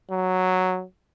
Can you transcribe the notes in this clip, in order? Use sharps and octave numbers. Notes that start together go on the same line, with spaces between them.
F#3